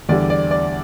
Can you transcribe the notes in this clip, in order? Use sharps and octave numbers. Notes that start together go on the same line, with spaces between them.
E2 D3 G3 D5
D5
D5